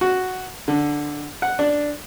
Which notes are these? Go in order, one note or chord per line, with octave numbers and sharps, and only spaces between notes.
F#4
D3
F#5
D4